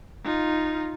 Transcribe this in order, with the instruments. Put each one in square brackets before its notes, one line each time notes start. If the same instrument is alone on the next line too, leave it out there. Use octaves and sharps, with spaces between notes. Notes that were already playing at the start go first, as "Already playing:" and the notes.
[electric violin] D#4 F4